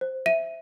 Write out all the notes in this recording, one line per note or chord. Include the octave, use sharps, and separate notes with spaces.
C5
E5 D#7